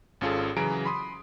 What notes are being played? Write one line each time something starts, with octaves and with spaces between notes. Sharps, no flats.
G#1 C#4 F4 G#4 A4
C#3 E3 F#3 G#4 A#5 D7
B5 C6 D#6